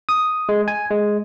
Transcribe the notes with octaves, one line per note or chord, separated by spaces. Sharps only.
D#6
G#3
G#5
G#3